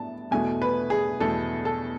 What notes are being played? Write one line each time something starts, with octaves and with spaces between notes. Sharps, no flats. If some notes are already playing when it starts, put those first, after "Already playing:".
Already playing: A2 B3 A5
E2 B2 A3 G#5
B4
G#4
E2 B2 A3 A4
A4